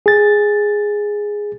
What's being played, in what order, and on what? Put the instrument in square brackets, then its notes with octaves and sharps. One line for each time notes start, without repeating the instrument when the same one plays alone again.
[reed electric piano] G#4 A6